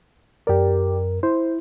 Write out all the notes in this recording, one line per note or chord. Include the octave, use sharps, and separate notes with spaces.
F#2 G4 A#4 D5
E4 C5